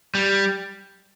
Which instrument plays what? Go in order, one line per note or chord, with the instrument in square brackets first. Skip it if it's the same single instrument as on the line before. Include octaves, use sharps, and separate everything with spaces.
[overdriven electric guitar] G3